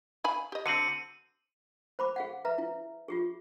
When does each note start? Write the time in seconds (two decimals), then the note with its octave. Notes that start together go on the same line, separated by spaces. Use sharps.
0.24 F5 G#5 B5
0.52 G4 D#5
0.66 D3 F#3 C4 C#7 D#7 F#7
1.99 C5 B5 D6
2.16 G#4 F5 F#5
2.45 B4 E5 A#5
2.58 E4
3.08 F4 G4 G#4